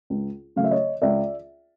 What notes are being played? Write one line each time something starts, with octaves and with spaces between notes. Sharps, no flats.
C#2
C#3 F#3 A3 F5
E5
C#5 D#5
C#2 D5 E5